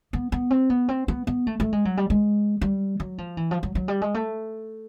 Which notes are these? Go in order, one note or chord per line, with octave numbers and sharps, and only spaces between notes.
B3
B3
C4
B3
C4
B3
B3
A3
A3
G#3
F#3
G3
G#3
G3
F#3
F3
E3
F3
F#3
F#3
G3
G#3
A3